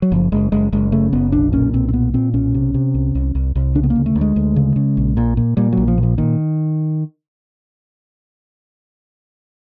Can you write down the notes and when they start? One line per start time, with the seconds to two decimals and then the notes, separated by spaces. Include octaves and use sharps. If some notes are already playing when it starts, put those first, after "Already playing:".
0.02 F#3
0.12 F#1 F3
0.32 F#1 G#3
0.52 F#1 G#3
0.72 F#1 G#3
0.92 C#3 A3
1.13 F#1 B3
1.32 B1 D4
1.53 A#2 C#4
1.73 B1 C4
1.89 C4
1.93 A#2 B3
2.14 A#2 C4
2.34 B1 C#4
2.54 C3
2.74 C3
2.94 C2
3.15 C2
3.35 C2
3.56 C2
3.75 C#3 D4
3.83 B3
3.90 A#3
3.96 D2
4.06 A3
4.15 D2
4.21 G#3
4.36 D2
4.56 C#3
4.76 C#3
4.97 A#1
5.17 A#2
5.37 A#2
5.57 A#2 G3
5.73 A#1 F#3
5.88 F3
5.98 A#2
6.03 F3
6.18 A#2 D#3